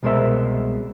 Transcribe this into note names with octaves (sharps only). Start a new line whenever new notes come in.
C2 B2 G#3 A#4 C5 E5